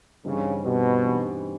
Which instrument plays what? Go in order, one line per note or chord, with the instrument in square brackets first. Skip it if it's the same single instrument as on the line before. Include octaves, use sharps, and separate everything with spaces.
[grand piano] G2 E3 G3 C4 D#4 [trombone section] C#3
[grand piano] G2 E3 G3 C4 D#4 [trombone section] B2
[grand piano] G2 E3 G3 C4 D#4